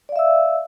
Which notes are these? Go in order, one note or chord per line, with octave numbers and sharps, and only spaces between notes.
D5 E5 F5 E6